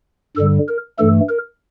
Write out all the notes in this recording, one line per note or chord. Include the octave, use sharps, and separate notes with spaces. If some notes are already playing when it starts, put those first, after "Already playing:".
G2 D3 G3 A4
A#4
G2 E3 A3 A4
A#4